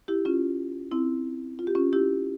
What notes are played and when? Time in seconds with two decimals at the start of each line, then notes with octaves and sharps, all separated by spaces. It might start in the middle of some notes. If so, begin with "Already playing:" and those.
0.08 E4 G4
0.25 C#4 F4
0.92 C4 E4
1.59 F4
1.67 G4
1.75 C#4 F4
1.93 E4 G4